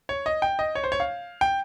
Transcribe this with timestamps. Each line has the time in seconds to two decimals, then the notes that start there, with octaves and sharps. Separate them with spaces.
0.09 C#5
0.26 D#5
0.42 G5
0.59 D#5
0.75 C#5
0.84 C5
0.92 C#5
1.00 F5
1.41 G5